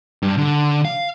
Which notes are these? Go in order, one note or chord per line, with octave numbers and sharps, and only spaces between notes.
G2
D3
F5